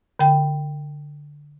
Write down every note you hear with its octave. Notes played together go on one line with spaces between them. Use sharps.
D3 G5